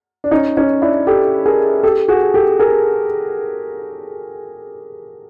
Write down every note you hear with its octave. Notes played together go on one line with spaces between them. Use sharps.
D4
C#4 D#4
C#4 D#4
D4 E4
G4 A4
G#4 A#4
G4 A4
F#4 G#4
G4 A4
G#4 A#4